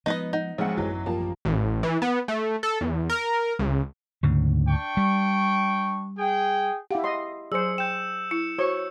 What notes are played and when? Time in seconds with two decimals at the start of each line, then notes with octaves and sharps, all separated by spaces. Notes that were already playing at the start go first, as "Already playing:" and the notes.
0.06 F3 G#3 B3 D#4 B4 D#5
0.33 D#4 F#5
0.58 B1 F3 G#3 C4 E5 F#5
0.77 A1 F#2 E3 F#3 B3
1.06 F3 G3 A#3 A5
1.45 A1
1.83 E3
2.02 B3
2.28 A3
2.63 A4
2.81 E2
3.09 A#4
3.59 C#2
4.23 D2 G#2 C#3
4.69 D4 G5 C#6
4.97 G3
6.18 G#4 G5
6.91 E4 G4 F5 F#5
7.04 D#5 C6
7.52 F#3 G#4 C5 E6 C#7
7.78 G5 G6 E7
8.31 E4 C#7
8.59 F#4 C5 C#5 C#6